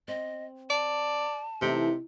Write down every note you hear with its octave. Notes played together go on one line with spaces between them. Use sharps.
C4 D#5
D5 A5
C3 E3 A3 D#4